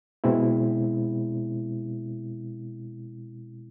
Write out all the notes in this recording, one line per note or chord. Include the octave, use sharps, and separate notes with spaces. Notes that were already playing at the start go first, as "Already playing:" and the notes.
B2 G#3 C4 E4